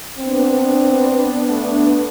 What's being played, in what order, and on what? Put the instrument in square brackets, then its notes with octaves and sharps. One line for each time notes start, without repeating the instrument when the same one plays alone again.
[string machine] B3 D4 [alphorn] C4
[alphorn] A3